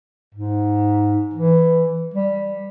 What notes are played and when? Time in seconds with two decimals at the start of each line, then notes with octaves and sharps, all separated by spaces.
0.35 G#2
1.34 E3
2.14 G3